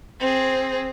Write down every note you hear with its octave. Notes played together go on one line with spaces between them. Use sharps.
C4 G#4